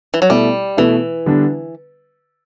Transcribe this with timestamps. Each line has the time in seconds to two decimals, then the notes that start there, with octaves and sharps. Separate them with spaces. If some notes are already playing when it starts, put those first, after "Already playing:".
0.14 E3
0.22 F#3
0.30 B2 G3 A3 E4
0.77 B2 E3 A3 E4
1.26 D3 G3 B3 D4